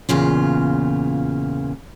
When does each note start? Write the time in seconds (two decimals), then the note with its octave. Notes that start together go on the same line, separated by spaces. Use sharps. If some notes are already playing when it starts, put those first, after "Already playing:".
0.09 E2 A#2 C#3 F4